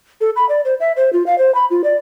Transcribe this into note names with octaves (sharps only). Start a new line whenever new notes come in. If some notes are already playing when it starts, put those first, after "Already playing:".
A4
B5
D5
C5
E5
C5
F4
F5
C5
B5
F4
D5